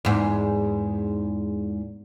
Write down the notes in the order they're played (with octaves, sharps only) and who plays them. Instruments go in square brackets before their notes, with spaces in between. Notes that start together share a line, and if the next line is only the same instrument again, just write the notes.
[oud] E2 G#2